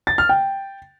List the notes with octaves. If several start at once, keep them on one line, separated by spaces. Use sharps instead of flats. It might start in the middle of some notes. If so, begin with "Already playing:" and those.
A6
F6
G5